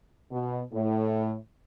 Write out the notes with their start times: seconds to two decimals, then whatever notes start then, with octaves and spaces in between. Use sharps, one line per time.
0.31 B2
0.73 A2